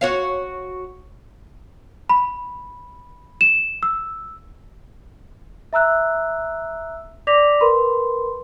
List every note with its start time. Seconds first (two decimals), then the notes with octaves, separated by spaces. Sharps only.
0.01 F#4 C#5 F5
2.10 B5
3.41 E7
3.83 E6
5.73 E5 A#5 E6 F#6
7.27 D5 D6 A#6 B6 F7
7.61 A#4 B4 B5 C6